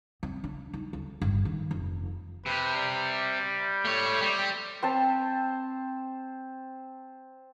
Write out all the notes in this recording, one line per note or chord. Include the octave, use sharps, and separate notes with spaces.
C4
D4
D#4
D2
G1
D#3
F1
C3 G4 B4
G3
A3 C#5
G3 C4 G4
C4 C5 A5